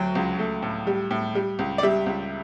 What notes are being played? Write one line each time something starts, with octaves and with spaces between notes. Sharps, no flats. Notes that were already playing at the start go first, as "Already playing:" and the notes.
Already playing: D2 F#3 G5
C#2
A3
A2
G3
A2
G3
C#2
D5
G3 E5
C#2